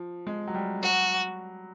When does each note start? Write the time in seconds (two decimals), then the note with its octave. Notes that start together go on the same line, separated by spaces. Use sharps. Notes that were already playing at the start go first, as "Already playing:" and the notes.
Already playing: F3
0.27 G#3
0.48 F#3
0.55 G3
0.83 F#3 F#4